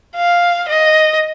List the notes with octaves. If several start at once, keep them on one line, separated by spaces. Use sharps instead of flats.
F5
D#5